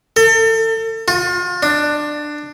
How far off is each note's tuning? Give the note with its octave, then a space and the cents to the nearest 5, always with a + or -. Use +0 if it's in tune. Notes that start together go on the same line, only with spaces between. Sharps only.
A4 +35
F4 +35
D4 +15